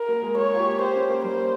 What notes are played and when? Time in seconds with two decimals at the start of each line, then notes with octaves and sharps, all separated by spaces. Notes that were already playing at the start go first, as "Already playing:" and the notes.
Already playing: A#4
0.08 A#3
0.22 G#3
0.37 A#3 C#5
0.54 F4
0.59 G4
0.80 G4 C5
0.95 C#4
1.10 A#3
1.24 G3 C5